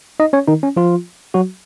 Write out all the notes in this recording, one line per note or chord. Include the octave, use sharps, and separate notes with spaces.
D#4 D#5
C#4 C#5
D#3 D#4
C#4
F3 F4
F#3 F#4